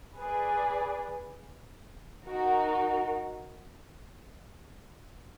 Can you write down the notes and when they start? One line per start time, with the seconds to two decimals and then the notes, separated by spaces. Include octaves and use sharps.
0.17 G#4 B4 D5
2.27 D#4 F#4 A#4